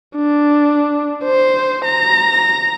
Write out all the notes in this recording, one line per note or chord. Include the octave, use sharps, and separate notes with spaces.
D4
C5
A#5